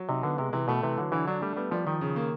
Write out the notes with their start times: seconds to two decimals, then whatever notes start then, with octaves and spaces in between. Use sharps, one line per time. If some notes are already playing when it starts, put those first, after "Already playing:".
Already playing: F#3
0.09 C3 D#4
0.23 D3 B3
0.38 C3 G#3
0.53 C3 E3
0.68 B2 A3
0.83 C3 E3
0.98 D3 F#3
1.12 D3 E3
1.27 F#3 D4
1.42 G3 A3
1.57 G3 B3
1.71 F3 G3
1.87 D#3 F3
2.01 C#3
2.16 A#3